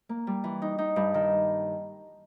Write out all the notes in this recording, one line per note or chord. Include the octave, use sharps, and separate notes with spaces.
A#3
G3
E3
D#4
D#4
G2
D#3